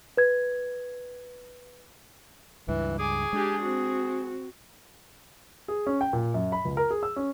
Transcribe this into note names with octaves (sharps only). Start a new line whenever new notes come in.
B4 G#6
C#2 G2 E3
G#4 G#5 D6
G#3 D4 G4
C4 F#4
G#4
C#4
G5
A#2
F#2
B5
C#2
A#4
G#4
E6
C#4